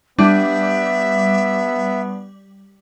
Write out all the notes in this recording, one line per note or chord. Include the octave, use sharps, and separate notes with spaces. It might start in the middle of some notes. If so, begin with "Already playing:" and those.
G3 B3 D4 E5